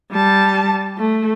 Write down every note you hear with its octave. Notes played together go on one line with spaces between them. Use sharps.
G3 A5
A3